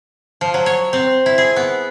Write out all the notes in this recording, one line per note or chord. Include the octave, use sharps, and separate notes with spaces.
F3
F#3
C#5
C4
E4
G#4
B3